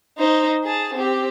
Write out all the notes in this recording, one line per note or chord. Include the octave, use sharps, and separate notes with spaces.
D#4 C5
G#4 A5
C4 G4